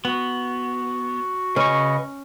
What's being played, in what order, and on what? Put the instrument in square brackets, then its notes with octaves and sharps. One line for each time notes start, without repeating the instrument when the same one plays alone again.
[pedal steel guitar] B3 [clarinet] F#4
[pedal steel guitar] C#3 C#6 [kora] C#4 [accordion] B4 D#5